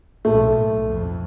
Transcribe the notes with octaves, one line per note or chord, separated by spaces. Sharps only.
B1 A2 A3
F2